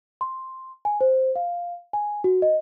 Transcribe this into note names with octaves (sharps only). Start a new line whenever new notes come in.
C6
G#5
C5
F5
G#5
F#4
D#5